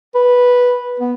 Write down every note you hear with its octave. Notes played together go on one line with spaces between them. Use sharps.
B4
B3